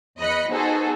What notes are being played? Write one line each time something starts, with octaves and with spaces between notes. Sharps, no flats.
E2 D#5 B5 F#6 C#7
B3 D#4 F#4 G#4 A4 C5